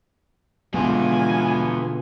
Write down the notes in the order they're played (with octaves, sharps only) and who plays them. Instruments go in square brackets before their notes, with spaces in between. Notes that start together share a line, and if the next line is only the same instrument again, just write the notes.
[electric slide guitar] B2 D3 F4 [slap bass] G#3 [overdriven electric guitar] B3 G#4 [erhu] G#5